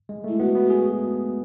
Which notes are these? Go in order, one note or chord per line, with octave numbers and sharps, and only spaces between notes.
G#3
A3 E4
B3 F#4
B3
G#4